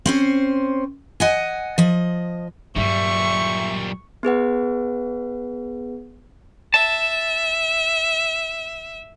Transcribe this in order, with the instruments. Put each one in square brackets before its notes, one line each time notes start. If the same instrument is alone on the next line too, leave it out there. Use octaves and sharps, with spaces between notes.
[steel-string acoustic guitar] C4 C#4 C5
D#5 F#5 G#5
F3 D#5
[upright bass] G2 F#3 [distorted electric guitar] A#2 G3 [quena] E5 [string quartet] C#6
[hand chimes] B3 G#4 B4 F#5
[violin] E5 [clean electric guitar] A5